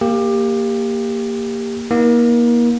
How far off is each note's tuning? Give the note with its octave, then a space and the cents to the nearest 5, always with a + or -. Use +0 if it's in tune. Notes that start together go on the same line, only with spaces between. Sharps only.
A#3 -10 G4 +20
A#3 +30 D#4 +40